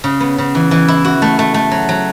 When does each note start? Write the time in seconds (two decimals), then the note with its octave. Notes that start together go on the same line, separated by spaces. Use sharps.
0.04 C#3
0.20 B3
0.38 C#3
0.55 E3
0.71 E3
0.88 E4
1.05 F#4
1.22 A3
1.39 A3
1.54 A3
1.71 F#3
1.89 F#3